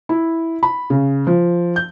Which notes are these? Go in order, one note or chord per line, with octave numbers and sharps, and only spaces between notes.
E4
B5
C#3
F3
G6